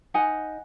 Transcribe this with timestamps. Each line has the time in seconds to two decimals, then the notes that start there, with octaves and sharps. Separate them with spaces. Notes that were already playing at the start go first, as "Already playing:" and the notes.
0.14 D#4 F#5 G#5